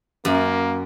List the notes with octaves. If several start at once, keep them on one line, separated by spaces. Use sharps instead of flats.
F#2 A#3